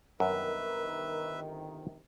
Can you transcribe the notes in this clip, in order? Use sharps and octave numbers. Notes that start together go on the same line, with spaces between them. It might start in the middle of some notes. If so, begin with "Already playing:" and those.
G1 F#2 C3 D#3 A#4 B4 E5